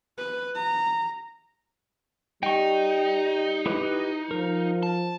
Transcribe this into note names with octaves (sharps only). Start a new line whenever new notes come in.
B4
A#5
G3 D#4 G5 C#6
E4 G4 B4
F3 A#4
A5